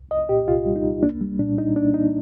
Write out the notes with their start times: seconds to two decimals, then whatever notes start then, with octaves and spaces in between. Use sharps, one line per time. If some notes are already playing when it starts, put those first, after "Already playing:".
Already playing: C2
0.11 C2 D#5
0.29 A#2 G4
0.47 C2 F4
0.66 G3
0.76 D#4
0.84 C2
1.03 A#3 D4
1.21 G3
1.39 A#2 D4
1.58 A#2 D#4
1.76 A#3 D4
1.94 A#3 D#4